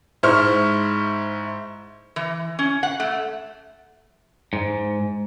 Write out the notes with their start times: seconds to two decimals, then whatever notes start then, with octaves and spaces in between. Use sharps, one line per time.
0.23 G#2 E4 C5 C#6 F6
2.16 E3
2.59 C#4
2.83 F#5
3.00 A3
4.53 G#2